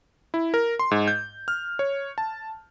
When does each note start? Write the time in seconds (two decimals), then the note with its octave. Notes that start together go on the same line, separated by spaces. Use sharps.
0.34 E4
0.54 A#4
0.79 C6
0.91 G#2
1.08 G6
1.48 F6
1.79 C#5
2.18 A5